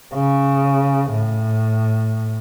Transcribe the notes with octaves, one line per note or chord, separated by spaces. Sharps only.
C#3
A2